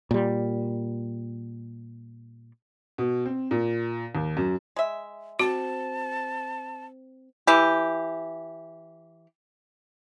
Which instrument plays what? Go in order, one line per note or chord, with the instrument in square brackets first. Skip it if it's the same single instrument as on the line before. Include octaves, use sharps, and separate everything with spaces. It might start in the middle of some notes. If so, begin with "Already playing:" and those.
[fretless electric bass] A#2 G3
[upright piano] B2
C4
A#2
D#2
F#2
[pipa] G#3 E5
[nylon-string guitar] C4 [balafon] F#4 [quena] A5
[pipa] E3 G4